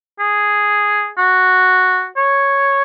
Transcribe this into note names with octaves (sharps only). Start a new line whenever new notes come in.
G#4
F#4
C#5